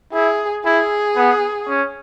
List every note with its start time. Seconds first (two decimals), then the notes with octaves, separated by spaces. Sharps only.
0.13 E4 G#4
0.65 E4 G#4
1.16 B3
1.67 C#4